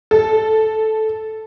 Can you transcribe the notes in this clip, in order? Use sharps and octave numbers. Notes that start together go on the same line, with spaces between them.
A4